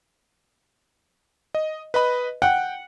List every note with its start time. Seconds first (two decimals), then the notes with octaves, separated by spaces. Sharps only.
1.55 D#5
1.94 B4 D#5 B5
2.42 F#5 G5